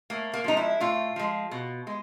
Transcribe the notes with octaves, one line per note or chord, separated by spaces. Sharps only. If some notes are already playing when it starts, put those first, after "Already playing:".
A2 A#3
A#3
F3 G#3 D#4
E4
A2 F4
F3 G#3
B2
G#3